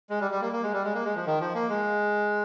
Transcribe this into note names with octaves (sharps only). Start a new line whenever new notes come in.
G#3
G3
G3
A#3
A#3
G#3
G3
G#3
A#3
G#3
F3
D#3
F3
A#3
G#3